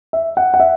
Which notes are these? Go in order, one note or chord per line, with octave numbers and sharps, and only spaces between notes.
E5
F#5
F#5
E5